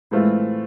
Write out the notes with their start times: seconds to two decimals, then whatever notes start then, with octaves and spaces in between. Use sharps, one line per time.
0.11 A2 E3 G#3 A3 C4 F4